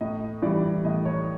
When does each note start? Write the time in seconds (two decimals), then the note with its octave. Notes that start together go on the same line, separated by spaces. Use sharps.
0.01 A2 D#5
0.42 E3 G3 D5
0.84 A2 D#5
1.05 C#5